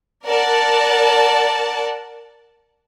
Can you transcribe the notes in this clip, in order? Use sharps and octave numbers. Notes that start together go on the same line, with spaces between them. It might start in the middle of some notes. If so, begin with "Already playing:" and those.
A#4 D5 F#5 A5